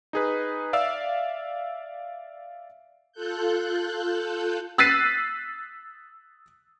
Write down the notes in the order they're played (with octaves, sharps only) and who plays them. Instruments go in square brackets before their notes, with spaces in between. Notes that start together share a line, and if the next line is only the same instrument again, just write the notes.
[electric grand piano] D#4 G#4 B4
D5 E5 F5 E6
[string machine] F4 A4 F#6 G6
[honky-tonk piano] E6 F#6 A6 B6 C7 D#7